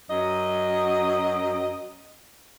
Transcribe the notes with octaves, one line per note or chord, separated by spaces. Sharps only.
F#2 F#3 D#5